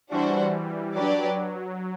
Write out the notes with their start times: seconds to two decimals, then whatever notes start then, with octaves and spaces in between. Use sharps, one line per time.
0.11 E3 G3 D4 F#4 C5
0.95 F#3 D4 G4 B4 D5